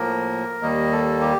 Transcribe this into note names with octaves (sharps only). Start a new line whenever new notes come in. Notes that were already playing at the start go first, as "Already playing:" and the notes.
Already playing: A2 F3 A#3 A#4
D#2 D#3 G3 A#3 D#5
A4
G4